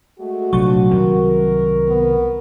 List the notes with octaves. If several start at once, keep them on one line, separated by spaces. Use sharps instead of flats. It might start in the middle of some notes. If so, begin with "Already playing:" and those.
G#3 A3 F#4 G#4
A#1 C3 F3 F#3 A3 D4 C#6
C2 D#3 C4 A#4
B3